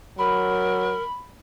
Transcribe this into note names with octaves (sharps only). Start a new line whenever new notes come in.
F#3 A#4 B5